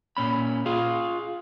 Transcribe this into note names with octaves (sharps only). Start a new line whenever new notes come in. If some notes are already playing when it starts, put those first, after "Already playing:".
A#2 C#4 B5
F4 G#4 F5